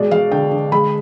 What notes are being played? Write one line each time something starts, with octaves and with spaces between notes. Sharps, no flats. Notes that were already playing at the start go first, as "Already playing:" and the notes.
Already playing: B2 G#3 D5
G#3 F5
D3 G5
D3
G#3 B5